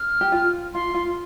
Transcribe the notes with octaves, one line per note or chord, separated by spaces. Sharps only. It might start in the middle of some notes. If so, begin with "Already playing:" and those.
Already playing: F6
G4
F4
F4 C6
F4